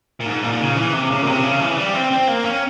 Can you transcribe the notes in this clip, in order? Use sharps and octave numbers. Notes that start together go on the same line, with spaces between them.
A#2
G#2
A#2
C#3
E3
C3
C#3
A#2
C3
C#3
E3
G3
C4
C4
A#3
C#4